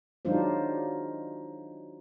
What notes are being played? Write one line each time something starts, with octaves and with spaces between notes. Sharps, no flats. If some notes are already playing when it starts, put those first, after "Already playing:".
F#3 G#3 D4 D#4 F4 C5